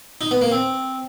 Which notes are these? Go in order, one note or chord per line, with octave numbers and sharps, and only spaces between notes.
D#4
B3
A#3
C4